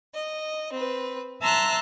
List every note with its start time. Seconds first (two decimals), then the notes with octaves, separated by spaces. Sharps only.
0.15 D#5
0.72 C4 B4
1.42 E5 A5 A#5 C6 E6 F#6